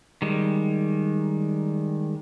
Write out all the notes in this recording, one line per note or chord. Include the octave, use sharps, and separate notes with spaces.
D#3 G3 G#3